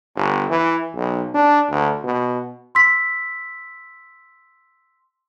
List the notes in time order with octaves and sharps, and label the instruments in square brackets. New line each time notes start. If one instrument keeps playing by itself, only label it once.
[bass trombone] G1
E3
B1
D4
D2
B2
[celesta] C6 E6 B6